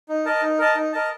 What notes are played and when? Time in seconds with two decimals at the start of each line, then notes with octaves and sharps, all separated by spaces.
0.09 D#4
0.25 A#4 D#5 A5
0.42 D#4
0.59 A#4 D#5 A5
0.75 D#4
0.93 A#4 D#5 A5